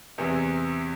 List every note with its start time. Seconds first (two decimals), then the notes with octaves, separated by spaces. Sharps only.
0.18 E2 C3 E3